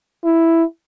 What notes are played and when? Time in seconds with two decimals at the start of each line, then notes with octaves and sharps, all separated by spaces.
0.24 E4